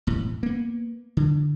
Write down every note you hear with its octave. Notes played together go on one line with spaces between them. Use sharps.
E1 A2
A#3 B3
D3